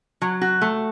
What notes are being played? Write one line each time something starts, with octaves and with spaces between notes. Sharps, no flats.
F#3
F#4
A3